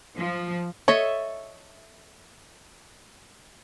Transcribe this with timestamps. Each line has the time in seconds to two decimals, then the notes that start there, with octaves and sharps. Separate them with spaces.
0.17 F3
0.88 A4 C#5 D#5 E5